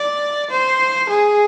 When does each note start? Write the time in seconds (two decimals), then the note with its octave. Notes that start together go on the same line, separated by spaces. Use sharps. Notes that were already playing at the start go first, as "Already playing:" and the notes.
Already playing: D5
0.51 C5
1.10 G#4